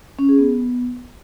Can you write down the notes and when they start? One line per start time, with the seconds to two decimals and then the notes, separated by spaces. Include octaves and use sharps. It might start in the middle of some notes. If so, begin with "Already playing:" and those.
0.19 C#4
0.29 G#4
0.39 B3